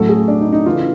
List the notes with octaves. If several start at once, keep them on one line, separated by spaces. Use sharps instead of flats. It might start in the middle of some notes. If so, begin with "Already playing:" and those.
Already playing: A2 F#3 A3 A4
G#4
D4
D#4
D#4
C#3 E3 A3 F4